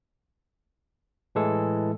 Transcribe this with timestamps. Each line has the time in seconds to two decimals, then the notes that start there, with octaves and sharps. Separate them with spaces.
1.35 A2 E3 G#3 A4